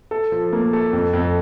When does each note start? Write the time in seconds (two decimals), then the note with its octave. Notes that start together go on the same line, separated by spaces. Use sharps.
0.11 A4
0.32 F3
0.53 A#3
0.73 A4
0.93 F2
1.13 F2